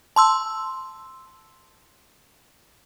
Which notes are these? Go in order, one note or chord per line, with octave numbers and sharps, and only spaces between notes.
A5 C6 E6